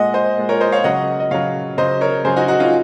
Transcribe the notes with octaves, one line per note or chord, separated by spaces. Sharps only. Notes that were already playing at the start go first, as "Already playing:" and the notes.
Already playing: A#2 G#3 D#5 F#5
C5 D#5
A#2 G#3
A#4 C#5
C5 D#5
C#5 F5
C#3 F#3 D#5 F#5
D#5
C#3 F#3 C#5 F5
C#3 F#3 C5 D#5
A#4 C#5
C#3 F#3 G#4 C5
D#4 F#4
D#4 F#4
C#4 F4